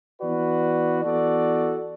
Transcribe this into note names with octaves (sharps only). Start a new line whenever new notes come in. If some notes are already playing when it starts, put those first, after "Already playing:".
E3 B3 F#4 B4 D5
E3 B3 F#4 A4 D5